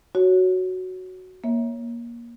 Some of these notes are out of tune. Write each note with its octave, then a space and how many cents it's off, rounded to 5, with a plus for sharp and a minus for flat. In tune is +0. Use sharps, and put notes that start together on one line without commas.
F#4 +0 C#5 +0
A#3 +20 C#5 +0 E5 -10